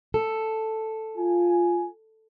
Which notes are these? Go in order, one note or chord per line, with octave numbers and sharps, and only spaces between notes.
A4
F4 G#5